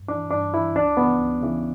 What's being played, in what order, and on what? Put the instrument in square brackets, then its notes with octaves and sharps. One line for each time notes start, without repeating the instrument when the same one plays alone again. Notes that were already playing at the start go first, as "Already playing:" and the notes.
Already playing: [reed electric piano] G2
E3 D4
G2 D4
E3 E4
C#2 D4
C#3 E3 B3
C#2
C#3 E3